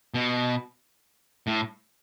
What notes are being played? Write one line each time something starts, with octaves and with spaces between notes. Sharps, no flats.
B2
A2